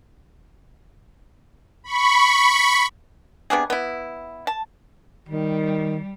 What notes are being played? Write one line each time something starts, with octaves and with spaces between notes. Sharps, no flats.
B5 C#6
C3 B3 D4 G#4
B3 E4
A5
D#3 G3